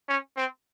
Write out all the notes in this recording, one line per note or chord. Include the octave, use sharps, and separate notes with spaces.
C#4
C4